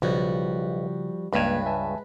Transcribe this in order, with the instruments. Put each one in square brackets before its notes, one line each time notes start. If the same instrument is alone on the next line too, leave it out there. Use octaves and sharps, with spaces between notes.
[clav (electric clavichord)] B1 [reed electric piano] C#3 [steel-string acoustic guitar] F3 G3 F#4
[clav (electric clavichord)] C#2 G2 [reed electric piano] C#3 A#3 G#6 [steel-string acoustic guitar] G#3 B4
[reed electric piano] E5 G#5 A5